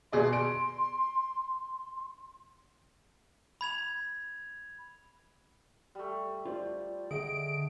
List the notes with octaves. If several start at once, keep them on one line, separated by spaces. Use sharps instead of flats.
B2 G#4 D5 C6
D7
B5 G#6 F7
G3 A3
F4 C5 D5
D3 G#4 D#5 E5 F#5 D7